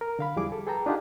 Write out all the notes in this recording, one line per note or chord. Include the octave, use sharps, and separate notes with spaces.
A#4
D3 F5 B5
E2 F3 G3 E4 G#4 D6
A4
G#4 A4 B4 G5 A5 A#5
D4 D#4 F4 G4 F#5 G#5